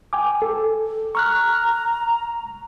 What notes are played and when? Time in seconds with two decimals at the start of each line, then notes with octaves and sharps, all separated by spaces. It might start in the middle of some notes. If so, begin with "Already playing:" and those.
0.13 G5 G#5 D6
0.42 A4
1.15 A#5 C#6 F6 F#6